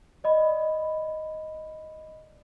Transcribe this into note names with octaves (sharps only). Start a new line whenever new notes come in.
D5 D#5 B5